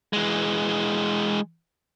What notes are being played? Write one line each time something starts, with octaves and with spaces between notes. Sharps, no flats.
E3 G#3